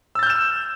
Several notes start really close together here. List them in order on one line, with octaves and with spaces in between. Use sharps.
E6 A6 G6 F6 E7